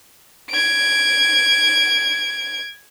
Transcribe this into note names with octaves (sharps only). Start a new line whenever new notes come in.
G#6 D7